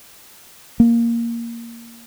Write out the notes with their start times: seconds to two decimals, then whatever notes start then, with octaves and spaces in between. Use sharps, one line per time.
0.80 A#3